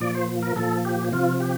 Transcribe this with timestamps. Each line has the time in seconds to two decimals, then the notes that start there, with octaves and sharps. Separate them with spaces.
0.01 A#2 F3 D5
0.15 C5
0.43 A#4
0.56 A#2 F3 A4
0.85 G4
1.12 C3 F3 F4
1.40 G4